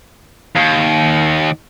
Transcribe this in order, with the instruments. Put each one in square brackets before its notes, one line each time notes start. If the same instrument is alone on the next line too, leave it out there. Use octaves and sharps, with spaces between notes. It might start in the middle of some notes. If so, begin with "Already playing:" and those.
[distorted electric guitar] D#2